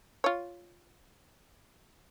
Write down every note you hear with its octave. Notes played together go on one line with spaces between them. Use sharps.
F4 C#5